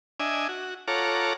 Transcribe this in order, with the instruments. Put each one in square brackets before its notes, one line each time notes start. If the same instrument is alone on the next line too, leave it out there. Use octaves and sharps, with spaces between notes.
[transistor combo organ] D4 D#5 E5 G#5
F#4
F4 A4 C#5 F#5 A#5 D6